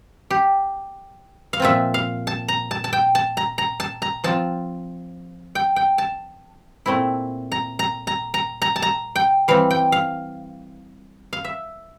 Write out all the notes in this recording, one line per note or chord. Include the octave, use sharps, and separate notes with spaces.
G4
F5
A#2 F3 C4 F4 E5
F5
A5
A#5
A5
A5
G5
A5
A#5
A#5
A5
A#5
F3 C4 F4 A5
G5
G5
A5
A#2 A3 C4 E4
A#5
A#5
A#5
A#5
A#5
A5
A#5
G5
E3 G3 C4 F5
G5
F5
F5
E5